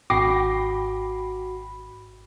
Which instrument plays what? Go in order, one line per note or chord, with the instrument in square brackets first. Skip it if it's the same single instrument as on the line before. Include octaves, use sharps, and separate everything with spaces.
[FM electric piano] G#1 B5 [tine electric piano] F#4 [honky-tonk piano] G5 A#6 C7 [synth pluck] D6